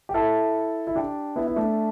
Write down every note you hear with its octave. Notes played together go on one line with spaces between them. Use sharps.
G4
E4 A4
E4
D4 G4
B3 E4
E4
A3 D4